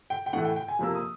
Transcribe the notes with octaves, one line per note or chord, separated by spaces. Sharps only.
G5
G5
A2 E3 A3 F#5
G5
G5
G#5
F2 C3 F3 A#3 E6
D#6